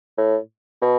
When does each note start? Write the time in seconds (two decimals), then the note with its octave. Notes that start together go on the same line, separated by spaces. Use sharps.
0.18 A2
0.82 B2